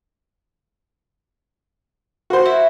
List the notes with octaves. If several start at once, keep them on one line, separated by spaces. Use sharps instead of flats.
F#4 C5
E4